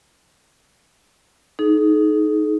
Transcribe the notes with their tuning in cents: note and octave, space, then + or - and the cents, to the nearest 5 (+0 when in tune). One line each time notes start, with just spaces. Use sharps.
D#4 +0 G#4 +45